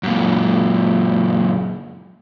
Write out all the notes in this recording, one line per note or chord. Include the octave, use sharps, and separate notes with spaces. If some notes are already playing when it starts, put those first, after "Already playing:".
F#2 A#2